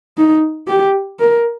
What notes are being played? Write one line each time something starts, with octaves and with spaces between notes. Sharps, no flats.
D#4
G4
A#4